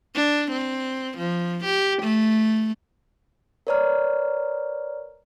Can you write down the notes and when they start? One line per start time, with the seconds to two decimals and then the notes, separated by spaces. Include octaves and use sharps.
0.15 D4
0.52 C4
1.18 F3
1.65 G4
2.02 A3
3.67 A#4 B4 C#5 D5 A#5 F6